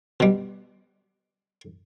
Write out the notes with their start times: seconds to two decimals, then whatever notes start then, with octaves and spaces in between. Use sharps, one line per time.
0.20 B2 G3